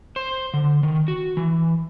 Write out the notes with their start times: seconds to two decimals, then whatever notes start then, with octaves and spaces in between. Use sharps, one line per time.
0.16 C5
0.54 D3
0.83 D#3
1.08 F#4
1.37 E3